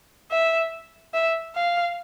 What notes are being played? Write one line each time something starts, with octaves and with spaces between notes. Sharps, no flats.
E5
E5
F5